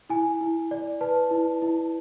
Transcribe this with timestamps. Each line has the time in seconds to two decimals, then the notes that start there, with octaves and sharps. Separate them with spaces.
0.10 E4 G#5
0.41 E4
0.71 D5
1.01 B4 A5
1.31 E4
1.62 E4